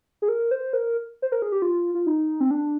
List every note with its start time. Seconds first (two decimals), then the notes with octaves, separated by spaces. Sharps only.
0.22 G#4
0.28 A#4
0.51 C5
0.73 A#4
1.22 C5
1.32 A#4
1.42 G#4
1.52 G4
1.62 F4
1.95 F4
2.07 D#4
2.41 C4
2.51 D4